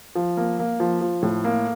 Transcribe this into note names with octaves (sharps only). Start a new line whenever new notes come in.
F3
A#3
A#3
F3
F3
A2
A#3